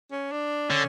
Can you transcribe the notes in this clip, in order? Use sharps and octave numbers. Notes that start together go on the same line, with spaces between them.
C#4
D4
D3 C#4